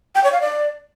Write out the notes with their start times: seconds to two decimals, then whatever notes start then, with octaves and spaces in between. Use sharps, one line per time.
0.15 G5
0.24 C#5
0.32 F5
0.41 D5